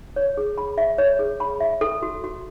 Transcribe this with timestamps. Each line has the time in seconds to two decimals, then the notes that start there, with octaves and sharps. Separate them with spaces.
0.16 C#5
0.37 G#4
0.58 B5
0.78 E5
0.98 C#5
1.19 G#4
1.40 B5
1.60 E5
1.81 A4
2.02 F#4
2.24 F#4